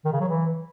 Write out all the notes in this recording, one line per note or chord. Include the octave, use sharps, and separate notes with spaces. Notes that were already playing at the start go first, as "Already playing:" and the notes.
D#3
C#3
F#3
E3